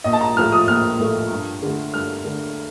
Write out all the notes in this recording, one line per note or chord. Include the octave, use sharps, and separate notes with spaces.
A#1 D#5
A5
A#5
A2 F3 A3 F6
D#6
A#1 F6
A2 F3 A3
G2
D3 A3
G2 F6
D3 A3